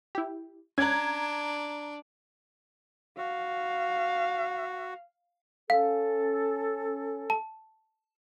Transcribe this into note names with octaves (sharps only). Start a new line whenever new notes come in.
E4 G4
C#4 D4 A#5 F#6 G#6
F#4 F5
C#4 A4 F5
A5